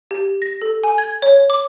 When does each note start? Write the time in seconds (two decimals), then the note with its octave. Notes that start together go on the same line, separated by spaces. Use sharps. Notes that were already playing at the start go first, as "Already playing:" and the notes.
0.11 G4
0.42 A#6
0.62 A4
0.83 G#5
0.98 G#6
1.22 C#5
1.50 D6